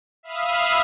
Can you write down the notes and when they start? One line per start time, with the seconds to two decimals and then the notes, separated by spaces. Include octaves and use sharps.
0.23 E5 F5 B5 D#6 F6